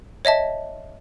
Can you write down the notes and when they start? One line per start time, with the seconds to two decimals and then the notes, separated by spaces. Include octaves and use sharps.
0.25 C#5 D#5 E5 A5